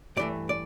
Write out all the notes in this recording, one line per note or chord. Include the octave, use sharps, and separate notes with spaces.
G2 E3 A3 D5
D5